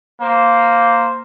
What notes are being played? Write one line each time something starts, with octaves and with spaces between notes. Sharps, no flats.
A#3 C5